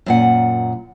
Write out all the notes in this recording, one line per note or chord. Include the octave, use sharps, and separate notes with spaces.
F#2 A#2 F#5